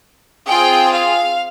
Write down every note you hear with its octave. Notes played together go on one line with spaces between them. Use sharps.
C4 F4 G#4 G5
F5